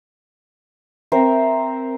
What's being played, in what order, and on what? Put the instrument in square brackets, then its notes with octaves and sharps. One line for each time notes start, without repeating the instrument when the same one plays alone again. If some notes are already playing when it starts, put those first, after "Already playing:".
[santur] C4 A#4 C5 E5